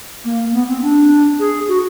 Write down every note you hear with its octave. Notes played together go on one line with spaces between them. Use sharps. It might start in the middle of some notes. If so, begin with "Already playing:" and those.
A#3
B3
C4
D4
G#4
F#4